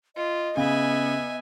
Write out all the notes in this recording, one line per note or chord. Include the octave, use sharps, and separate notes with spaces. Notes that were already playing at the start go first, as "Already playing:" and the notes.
F4 D#5
C#3 B3 E5 G#5